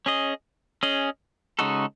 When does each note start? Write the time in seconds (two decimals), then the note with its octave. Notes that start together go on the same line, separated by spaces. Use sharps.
0.06 C#4 G#4 D#5
0.83 C#4 G#4 D#5
1.59 C#3 G#3 D#4 F#4 A4